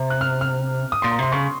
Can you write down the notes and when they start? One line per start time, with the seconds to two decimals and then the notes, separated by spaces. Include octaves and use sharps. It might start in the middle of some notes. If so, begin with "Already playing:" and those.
Already playing: C3
0.10 F#6
0.21 F6
0.41 F6
0.92 D#6
1.02 A#2 C6
1.11 A#5
1.19 C3 C6
1.32 C#3 C#6